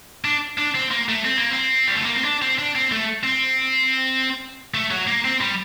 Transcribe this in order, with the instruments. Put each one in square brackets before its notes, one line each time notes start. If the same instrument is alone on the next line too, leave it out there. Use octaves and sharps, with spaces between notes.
[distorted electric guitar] D4
D4
C4
A#3
A3
C4
A#3
C4
G3
A3
A#3
C4
D4
C4
D4
C4
A3
C4
A3
F#3
A#3
C4
G3